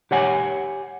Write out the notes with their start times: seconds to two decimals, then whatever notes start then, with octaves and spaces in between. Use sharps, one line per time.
0.11 G4 C#5 F#5 G#5